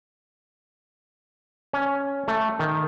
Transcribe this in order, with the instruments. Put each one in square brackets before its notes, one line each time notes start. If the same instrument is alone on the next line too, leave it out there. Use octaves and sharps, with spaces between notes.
[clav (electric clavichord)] C#4
A3
D#3